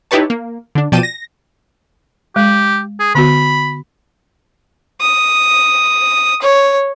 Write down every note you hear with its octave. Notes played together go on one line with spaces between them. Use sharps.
D#4 E4 G4 B4 C#5 A5
A#3
D3 D4
B2 F3 D5 G5 A5 D#7
A#6
G#3 G4
G#4
D3 B3 F#4 B5
D#6
C#5